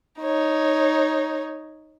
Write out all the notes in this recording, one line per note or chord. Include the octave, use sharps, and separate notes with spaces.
D#4 C#5